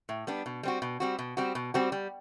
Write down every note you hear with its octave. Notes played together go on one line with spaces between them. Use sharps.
A2
G3 B3 D4
B2
G3 C4 F#4
B2
G3 C4 F#4
B2
G3 C4 F#4
B2
G3 C4 F#4
G3